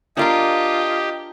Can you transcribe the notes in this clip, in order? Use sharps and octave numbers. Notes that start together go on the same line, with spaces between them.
D4 F4 G4 A#4 D#5 F5